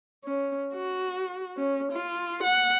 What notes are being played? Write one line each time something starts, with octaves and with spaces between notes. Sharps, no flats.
C#4
F#4
C#4
F4
F#5